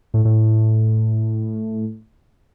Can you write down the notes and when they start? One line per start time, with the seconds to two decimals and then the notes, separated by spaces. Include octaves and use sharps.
0.14 A2
0.25 A2